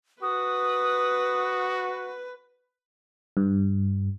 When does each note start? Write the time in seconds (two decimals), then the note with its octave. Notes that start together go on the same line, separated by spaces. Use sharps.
0.22 F#4 B4 D#6
3.37 G2